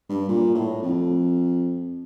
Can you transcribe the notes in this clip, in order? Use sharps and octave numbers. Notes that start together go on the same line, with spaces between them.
G2
A#2
A2
F2